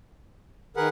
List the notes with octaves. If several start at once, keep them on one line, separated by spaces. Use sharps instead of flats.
D#3 G#4 A#4 B4 F#5